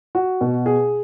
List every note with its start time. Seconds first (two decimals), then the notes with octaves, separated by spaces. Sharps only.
0.15 F#4
0.41 B2
0.66 G#4